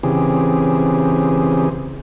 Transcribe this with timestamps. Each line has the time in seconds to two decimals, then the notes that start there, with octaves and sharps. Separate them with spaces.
0.03 C#3 E3 C4 G4 G#4